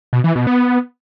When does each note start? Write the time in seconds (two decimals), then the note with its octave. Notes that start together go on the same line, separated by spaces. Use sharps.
0.13 B2
0.24 E3
0.35 B2
0.47 B3